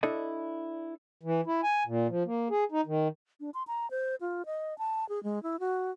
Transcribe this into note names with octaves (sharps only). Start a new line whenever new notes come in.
D4 E4 A4 D5 D#5
E3
E4
G#5
A#2
F3
A#3
G#4
D#4
D#3
D4
C6
A#5
C5
F4
D#5
A5
G#4
G#3
E4
F#4